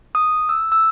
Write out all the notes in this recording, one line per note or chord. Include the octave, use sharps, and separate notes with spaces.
D#6
E6
E6